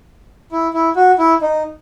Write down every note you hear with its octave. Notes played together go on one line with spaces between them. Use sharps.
E4
E4
F#4
E4
D#4